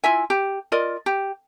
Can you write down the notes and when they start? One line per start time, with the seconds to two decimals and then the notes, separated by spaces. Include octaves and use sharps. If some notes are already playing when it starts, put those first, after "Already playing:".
0.04 E4 F4 E5 G#5
0.30 G4
0.72 F4 A#4 D5 D#5
1.06 G4